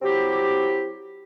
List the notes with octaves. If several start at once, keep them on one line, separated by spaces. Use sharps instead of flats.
F#3 C4 E4 G4